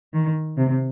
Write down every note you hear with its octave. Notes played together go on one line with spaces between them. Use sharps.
D#3
C3